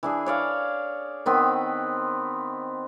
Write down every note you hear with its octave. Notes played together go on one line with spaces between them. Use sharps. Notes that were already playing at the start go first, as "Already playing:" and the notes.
E3 D4 G#4
C#5 D5 F5
D#3 B3 C4